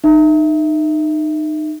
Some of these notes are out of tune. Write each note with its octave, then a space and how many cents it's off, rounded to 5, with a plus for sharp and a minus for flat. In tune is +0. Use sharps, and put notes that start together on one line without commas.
D#4 -25 E5 +0